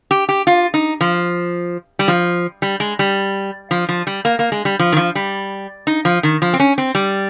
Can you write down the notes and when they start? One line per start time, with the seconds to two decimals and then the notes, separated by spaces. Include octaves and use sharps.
0.11 G4
0.29 G4
0.47 F4
0.74 D#4
1.01 F3
1.99 G3
2.08 F3
2.62 G3
2.80 G#3
2.99 G3
3.71 F3
3.89 F3
4.07 G3
4.25 A#3
4.39 A#3
4.52 G#3
4.65 G3
4.79 F3
4.92 D#3
4.97 F3
5.15 G3
5.87 D#4
6.05 F3
6.23 D#3
6.42 F3
6.53 C4
6.60 C#4
6.78 C4
6.95 G3